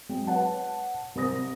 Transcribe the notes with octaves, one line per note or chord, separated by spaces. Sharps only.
F#3 G#3 C4
B4 C#5 F#5 A5
C2 A#4 C5 D#6 A#6